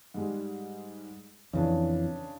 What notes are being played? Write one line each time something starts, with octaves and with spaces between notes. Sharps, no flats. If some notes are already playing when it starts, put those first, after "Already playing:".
G#2 G3 G#3
F2 C#3 E3 D4